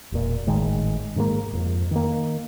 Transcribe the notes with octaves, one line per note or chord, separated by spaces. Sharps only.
E1 A#2
G#1 A2 D#3 G#3
G#2 D#3 G#3 A#3
D#1 F2
D#3 A#3